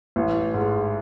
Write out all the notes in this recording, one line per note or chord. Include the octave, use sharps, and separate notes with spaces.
A1
G#2